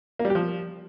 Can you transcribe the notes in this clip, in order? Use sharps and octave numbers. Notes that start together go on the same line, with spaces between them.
A#3
G3
G4
F3